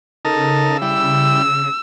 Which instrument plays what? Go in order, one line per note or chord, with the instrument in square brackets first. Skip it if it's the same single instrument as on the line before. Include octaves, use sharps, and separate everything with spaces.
[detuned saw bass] C#3 [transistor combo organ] D#4 A4 A#4
[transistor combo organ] G3 E4 [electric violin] E6